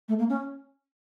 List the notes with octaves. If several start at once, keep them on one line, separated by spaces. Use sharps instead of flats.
A3
A#3
C#4